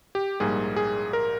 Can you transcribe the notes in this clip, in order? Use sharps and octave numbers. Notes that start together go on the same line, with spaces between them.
G4
A#1 G#2 G3 A#3 G#4
G#4
A#4